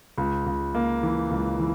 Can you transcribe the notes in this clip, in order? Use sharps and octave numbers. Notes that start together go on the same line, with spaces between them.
C#2
C#2
A#3
E3
C#2
E3